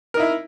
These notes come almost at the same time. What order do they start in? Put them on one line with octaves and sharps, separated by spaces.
A#4 D#4 E4 E5